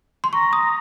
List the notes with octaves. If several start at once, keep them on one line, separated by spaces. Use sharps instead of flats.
C6
A#5 C#6
D#6